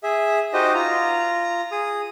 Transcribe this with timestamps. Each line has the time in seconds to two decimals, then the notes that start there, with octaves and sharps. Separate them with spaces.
0.03 G#4 E5
0.53 D#4 F#4 G4 C5 D#5
0.75 F4 A#5
1.71 G#4 D#6